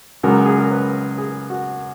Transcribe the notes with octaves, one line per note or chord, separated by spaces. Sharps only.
C#2 C#3 F#3 A#4
G#4
A#4
B4
G#4
F#4